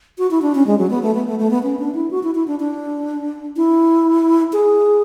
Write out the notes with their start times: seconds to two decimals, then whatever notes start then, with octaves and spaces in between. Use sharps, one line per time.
0.18 F#4
0.31 E4
0.42 D4
0.55 C#4
0.67 G#3
0.78 F#3
0.90 B3
1.03 A3
1.15 B3
1.27 A3
1.39 A3
1.51 B3
1.63 C#4
1.79 D4
1.95 E4
2.11 F#4
2.23 E4
2.35 E4
2.47 D4
2.60 D4
3.57 E4
4.53 G#4